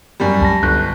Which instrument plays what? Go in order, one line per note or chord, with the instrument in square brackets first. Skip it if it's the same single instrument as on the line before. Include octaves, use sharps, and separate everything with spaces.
[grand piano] F#2 G3
[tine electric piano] C#2 A5 A#6
[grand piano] G1 [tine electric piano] F#6